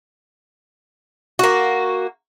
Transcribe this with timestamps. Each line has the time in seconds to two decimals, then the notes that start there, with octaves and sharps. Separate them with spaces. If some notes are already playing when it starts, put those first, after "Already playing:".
1.39 A#3 F#4